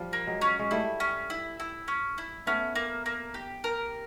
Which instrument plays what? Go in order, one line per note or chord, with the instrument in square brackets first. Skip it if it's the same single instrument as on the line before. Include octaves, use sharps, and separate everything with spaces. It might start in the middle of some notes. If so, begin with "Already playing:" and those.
Already playing: [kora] F3 G3
[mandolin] A#3
[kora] F#3 G#3
[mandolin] C#4
[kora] G#3
[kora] G3 A3 [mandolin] E4
[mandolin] C#4
E4
E4
C#4
E4
[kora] A3 B3 [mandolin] C#4
[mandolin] A#3
A#3
G4
A#4